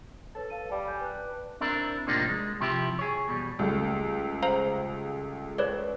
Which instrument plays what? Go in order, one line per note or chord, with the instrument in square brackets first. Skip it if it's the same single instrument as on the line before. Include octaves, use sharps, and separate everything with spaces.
[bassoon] A4 [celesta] B4 C#5 A6
[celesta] F5 A5 D#7
[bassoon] G3 [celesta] F5 B5
[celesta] G#5 G6
B4 A5 F#6
[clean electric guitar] C4 D4 E4 A#4
A2 C3 F3 A#3 D4 D#4
G#3
C3 F3 E4 G4
G#4 C#5
E2 B2 G3
[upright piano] C#2 G3 A3
[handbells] C5 F5 A#5
B4 C#5 D5